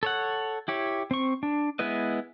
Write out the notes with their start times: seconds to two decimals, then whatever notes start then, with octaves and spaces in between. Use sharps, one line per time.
0.03 A4 C#5 F#5
0.68 E4 G4 C#5
1.11 C4 C#6
1.43 D4
1.79 G#3 B3 E4 B4 D#5